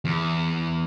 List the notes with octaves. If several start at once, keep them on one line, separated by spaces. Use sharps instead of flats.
E2